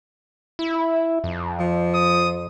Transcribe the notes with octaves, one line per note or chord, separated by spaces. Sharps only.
E4
F2
F3
D#6